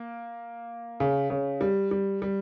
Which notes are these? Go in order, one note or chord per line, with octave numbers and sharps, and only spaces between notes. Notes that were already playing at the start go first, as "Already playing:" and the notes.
Already playing: A#3
C#3
C#3
G3
G3
G3